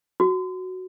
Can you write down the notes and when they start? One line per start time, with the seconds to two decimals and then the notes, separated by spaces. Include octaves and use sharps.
0.20 F#4